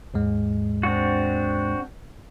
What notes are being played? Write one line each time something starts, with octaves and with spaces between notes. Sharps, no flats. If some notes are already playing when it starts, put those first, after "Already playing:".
D#2 G#2 G#3
C4 D4 F#4